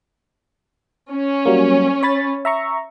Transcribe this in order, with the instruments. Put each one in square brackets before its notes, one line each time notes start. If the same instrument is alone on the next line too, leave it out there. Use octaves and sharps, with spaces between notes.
[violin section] C#4
[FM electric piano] F#3 G3 A#3
C#5 B5 A6
E5 A#5 C#6